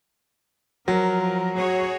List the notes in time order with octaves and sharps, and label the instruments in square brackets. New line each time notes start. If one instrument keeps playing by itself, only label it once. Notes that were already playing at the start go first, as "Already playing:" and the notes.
[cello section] F3 A#4 [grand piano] F#3
[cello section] F#4 G#4 C#5